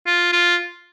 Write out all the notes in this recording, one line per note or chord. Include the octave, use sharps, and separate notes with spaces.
F4
F4